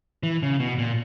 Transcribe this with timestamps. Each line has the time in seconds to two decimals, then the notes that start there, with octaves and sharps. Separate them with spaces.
0.23 E3
0.43 C#3
0.60 B2
0.78 A#2